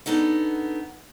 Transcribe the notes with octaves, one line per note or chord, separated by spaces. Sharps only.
B3 D4 D#4 A4 F#5